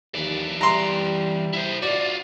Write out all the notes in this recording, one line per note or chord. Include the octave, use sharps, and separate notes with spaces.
D#2 E3 D5
G3 A#5 C6
E4 C5
F4 F#4 D5